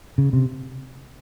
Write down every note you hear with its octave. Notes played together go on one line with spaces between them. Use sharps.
C#3
C3